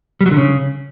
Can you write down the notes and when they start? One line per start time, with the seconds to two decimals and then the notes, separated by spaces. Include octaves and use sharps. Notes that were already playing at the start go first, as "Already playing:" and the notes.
0.21 G3
0.26 F#3
0.31 D3
0.37 C#3